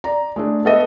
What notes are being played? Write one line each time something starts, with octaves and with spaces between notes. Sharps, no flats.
D5 A#5
G#3 A3 D4
B3 A4 D#5 E5